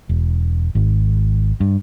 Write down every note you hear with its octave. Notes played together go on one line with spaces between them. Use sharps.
E1
G#1
G2